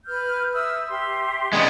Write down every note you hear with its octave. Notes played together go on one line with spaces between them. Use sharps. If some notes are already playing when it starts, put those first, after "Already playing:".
B4 F6 G6
E5 D#6 E6
G4 E5 C6
G#3 B3 C#4 D4